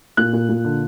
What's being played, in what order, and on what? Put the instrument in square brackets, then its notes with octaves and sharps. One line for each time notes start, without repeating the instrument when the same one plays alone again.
[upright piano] A#2 F#6
A#2
A#2
D3